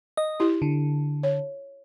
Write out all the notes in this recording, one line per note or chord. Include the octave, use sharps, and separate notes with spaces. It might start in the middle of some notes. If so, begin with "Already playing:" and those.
D#5
E4 G4
D3
C#5